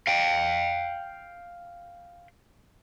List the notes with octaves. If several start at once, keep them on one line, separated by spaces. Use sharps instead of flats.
F5 G5